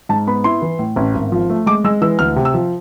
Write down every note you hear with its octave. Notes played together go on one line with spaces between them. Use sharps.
G#2 A5
B3 B5
E4 C6
E3
A2
A1
G#1
F3
A3
G#3 D6
G#3 E6
E3 E6
D2 F6
C3
E6
F3